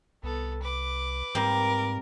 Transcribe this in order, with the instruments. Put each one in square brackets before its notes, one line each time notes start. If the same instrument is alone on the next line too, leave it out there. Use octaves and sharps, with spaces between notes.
[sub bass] C2 [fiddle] B3 A4
[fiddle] B4 D6
[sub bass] G#2 [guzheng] G3 A#3 C4 [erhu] A#4